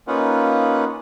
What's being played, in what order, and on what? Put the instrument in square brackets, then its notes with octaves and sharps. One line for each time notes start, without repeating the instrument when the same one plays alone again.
[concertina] A#3 C#4 D#4 F4 B4 F#5